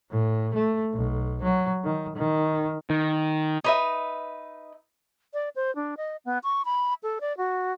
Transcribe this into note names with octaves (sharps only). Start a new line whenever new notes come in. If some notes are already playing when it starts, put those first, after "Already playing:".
A2
A3
B1
F#3
D#3
D#3
D#3
D#4 B4 E5
D5
C5
D4
D#5
B3
C#6
B5
A4
D5
F#4